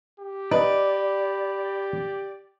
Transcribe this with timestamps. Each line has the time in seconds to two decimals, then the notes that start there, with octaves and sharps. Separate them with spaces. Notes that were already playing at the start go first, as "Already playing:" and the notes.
0.19 G4
0.51 D#4 B4 D5